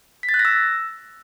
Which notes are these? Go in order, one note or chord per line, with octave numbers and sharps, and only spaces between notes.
B6
A6
F#6
A#6
E6